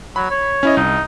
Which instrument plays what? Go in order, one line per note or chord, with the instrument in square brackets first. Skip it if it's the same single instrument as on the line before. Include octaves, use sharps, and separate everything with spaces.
[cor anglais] F#3 [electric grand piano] B5
[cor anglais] C#5
[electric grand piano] C#4 E4 D#5
[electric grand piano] C2 [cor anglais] D#4